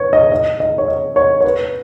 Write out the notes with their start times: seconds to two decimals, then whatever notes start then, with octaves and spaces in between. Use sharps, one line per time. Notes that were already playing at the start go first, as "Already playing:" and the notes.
Already playing: B4 C#5
0.13 D#5
0.32 D#5
0.60 D#5
0.78 C#5
0.88 D#5
1.16 C#5
1.41 C#5
1.44 B4